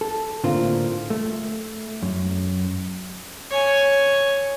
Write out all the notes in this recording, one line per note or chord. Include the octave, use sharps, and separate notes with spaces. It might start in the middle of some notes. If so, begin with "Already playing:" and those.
A4
A2 D3 A#3 C4 F4
A3
F#2
C#5 G#5